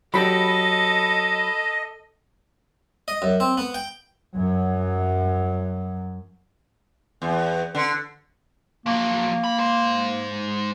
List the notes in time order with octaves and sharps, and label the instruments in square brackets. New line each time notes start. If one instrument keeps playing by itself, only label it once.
[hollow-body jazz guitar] F#3 G4 [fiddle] A4 [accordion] D#5 [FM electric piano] B5 B6
[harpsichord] D#5
F#2
C4
B3
G5
[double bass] F#2 F#3
[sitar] E2
D3
[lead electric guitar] F3 F#3 [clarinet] A#3
[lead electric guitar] D4 B5
G#2 C5